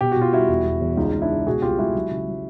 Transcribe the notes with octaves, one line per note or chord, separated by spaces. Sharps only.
B2 G4
B2 F#4
F4
G3 E4 F#4
E1
E1
E2
C#2 D#4 F4
C#2
D4 E4
C#2
B2 F#4 G#4
C2 F4 G4
G#3 E4 F#4
F#3
C#3
F#3